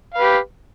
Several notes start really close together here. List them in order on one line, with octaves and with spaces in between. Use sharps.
F5 B4 G4